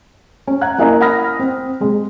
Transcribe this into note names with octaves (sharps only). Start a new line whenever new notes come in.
C#4
F#5 A#5 F#6 G#6
A#3 C#4 E4 D#5 G#5 A#5
F#5 B5 D#6 F6 A#6
C4
C3 G#3